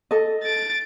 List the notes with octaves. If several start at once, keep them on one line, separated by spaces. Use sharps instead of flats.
A4 D#5
A6 D7